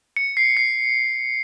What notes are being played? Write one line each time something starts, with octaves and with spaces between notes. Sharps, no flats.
C#7
C7
C7